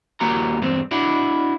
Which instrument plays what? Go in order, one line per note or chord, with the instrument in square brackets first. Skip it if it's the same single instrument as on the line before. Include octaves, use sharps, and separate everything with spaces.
[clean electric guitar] D#2 G3 A#3 F#4 A#5
E2 G2 G#3 C4
D4 E4 F#4